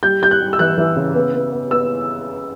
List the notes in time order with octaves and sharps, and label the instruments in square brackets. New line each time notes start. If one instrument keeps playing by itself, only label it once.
[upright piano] G3 G6
G3 G6
F#6
G3
E6
E3 F#6
E3
C#3
B3
B3
B3
B3 E6